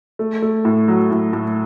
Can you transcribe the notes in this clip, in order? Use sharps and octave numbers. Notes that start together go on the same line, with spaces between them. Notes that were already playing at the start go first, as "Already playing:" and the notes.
A3
A3
A2
F#3
A2
A2